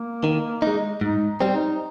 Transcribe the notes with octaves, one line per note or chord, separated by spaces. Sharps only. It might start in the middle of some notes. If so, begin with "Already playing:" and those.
Already playing: A#3
D#3
G#3 D#4
G#2 D#4
G3 C4
D#4